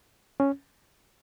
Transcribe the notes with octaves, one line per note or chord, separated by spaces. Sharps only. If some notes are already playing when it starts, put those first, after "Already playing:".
C#4